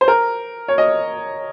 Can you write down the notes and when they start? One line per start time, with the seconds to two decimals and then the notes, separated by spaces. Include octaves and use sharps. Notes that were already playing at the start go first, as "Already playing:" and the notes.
0.01 C5
0.08 A#4
0.68 C#5
0.78 D#5